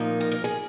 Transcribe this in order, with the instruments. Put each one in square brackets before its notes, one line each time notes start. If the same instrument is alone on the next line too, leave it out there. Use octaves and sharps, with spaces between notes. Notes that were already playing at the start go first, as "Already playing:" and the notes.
Already playing: [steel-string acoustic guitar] A#2 F3 A#3 D#4
A#4
A#4
G#4